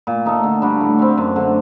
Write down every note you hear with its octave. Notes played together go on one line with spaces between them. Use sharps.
A#2
A3 D#4 A4
D3
G3 D4 F#4
A2
G3 C4
F#2
D3 A3